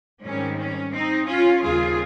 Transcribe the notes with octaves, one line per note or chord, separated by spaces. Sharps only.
G#2 D#3 G3 C4 C#4
C#4
C4 D#4
C#4 F4
D#2 C#3 G3 C4 F4 G#4